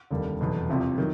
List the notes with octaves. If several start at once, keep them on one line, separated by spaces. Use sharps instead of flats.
F1 D#2 D3 G3 A#3
F1 E2 B2 F#3
C2 C3 F3
D#3 F#3